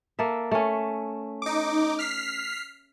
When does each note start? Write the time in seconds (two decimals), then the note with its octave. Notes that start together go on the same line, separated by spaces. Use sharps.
0.19 A#3 A4 E5
0.51 A3 C#4
1.42 D#4 D6
1.99 F6 B6 C7